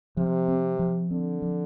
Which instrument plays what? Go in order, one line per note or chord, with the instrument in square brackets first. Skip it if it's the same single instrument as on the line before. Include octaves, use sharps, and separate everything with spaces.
[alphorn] C3 [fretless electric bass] F3
[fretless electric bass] C4
F3
[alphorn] D3 [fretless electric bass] C4
[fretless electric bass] F3